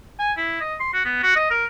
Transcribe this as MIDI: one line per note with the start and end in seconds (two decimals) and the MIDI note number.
0.19 0.32 80
0.37 0.57 64
0.61 0.75 75
0.80 0.90 84
0.93 1.04 66
1.05 1.18 59
1.23 1.35 66
1.36 1.47 75
1.51 1.65 70